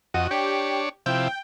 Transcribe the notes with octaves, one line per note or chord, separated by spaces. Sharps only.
F2 F#4 D#5
D4 G4 C#5
C3 F3 E4 G5